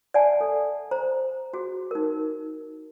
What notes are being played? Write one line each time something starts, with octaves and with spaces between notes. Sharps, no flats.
D5 E5 F#5 G#5 A5
A4
C5 A#5
F#4 G#4
D#4 A#4